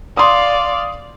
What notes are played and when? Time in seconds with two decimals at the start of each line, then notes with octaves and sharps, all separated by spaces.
0.17 D5 F5 C6 D#6